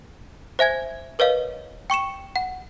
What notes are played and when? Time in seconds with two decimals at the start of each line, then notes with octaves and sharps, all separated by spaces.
0.59 C5 E5 G#5 G#6
1.19 A#4 B4 C#5 D#5 F5
1.90 G5 C#6 C#7 E7
2.36 F#5